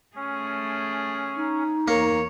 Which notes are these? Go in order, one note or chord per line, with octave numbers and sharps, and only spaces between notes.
A3 C#4 G#4
D#4
E2 A#3 C#5